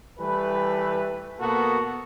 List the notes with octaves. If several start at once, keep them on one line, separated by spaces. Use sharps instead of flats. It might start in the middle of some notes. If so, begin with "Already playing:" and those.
E3 G3 A3 B4
B2 A#3 B3 F#4 A4